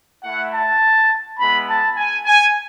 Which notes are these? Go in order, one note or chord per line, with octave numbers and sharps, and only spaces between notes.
A3 E4 F#5
A5
G#3 B3 E4 B5
A5
G#5
G#5